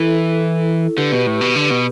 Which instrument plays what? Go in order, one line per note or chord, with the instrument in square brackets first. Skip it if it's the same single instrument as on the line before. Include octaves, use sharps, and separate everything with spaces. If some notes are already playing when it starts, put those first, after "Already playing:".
Already playing: [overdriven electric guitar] E3 [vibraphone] E4 A4
[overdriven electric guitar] D3 [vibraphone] G4 B4
[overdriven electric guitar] B2
A2
B2
D3
B2